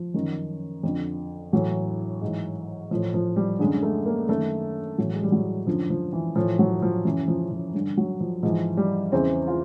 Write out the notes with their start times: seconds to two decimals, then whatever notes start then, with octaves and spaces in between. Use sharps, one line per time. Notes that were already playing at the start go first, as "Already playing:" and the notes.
Already playing: F3
0.14 F#2 D#3
0.83 F2 D3
1.53 A2 E3 F#3
2.22 G#2 E3
2.91 A2 E3 F3
3.14 F3
3.36 G3
3.59 F#2 D3 G#3
3.83 A3
4.06 A#3
4.29 F#2 D#3 A3
4.98 A2 E3 F#3
5.13 G#3
5.23 G3
5.32 F#3
5.67 F#2 D3 F3
5.90 F3
6.13 E3
6.36 A2 E3 F3
6.59 F#3
6.82 F3
7.05 F#2 C#3 E3
7.28 F3
7.51 F3
7.74 G2 D3
7.97 F#3
8.20 F3
8.43 G#2 E3 F3
8.77 G3
9.12 E2 C#3 E3 C4
9.48 F4